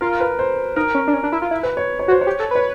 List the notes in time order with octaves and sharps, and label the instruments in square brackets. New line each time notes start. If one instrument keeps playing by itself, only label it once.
[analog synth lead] F4 [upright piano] A#4
[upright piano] B4
C5
[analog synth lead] D#4 [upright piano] A#4
[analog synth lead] C#4
D4
C#4
D4
E4
F4
E4
[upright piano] B4
C#5
C#5
[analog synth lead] F#4
[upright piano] C5
C#5
[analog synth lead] G4
A4
[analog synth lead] B4 [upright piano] C#5